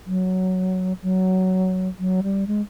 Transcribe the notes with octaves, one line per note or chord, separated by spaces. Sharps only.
F#3
F#3
F#3
G3
G#3